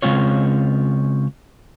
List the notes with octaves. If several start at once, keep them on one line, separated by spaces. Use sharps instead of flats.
C#3 G#3 C4 F4 C#5